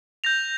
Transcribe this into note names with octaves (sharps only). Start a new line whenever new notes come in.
G6 A#6 F7